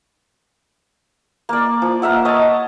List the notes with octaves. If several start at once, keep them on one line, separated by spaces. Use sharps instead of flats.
A#3 D5
F3
A#3 A#4 E5 F#5
C#5 D#5 A5